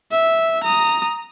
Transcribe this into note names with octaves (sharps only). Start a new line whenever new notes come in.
E5
A#5 D#6